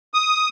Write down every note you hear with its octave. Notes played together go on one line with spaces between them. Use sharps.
D#6